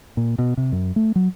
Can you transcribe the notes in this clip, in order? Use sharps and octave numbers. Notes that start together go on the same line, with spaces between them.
A#2
B2
C3
F#2
A3
F#3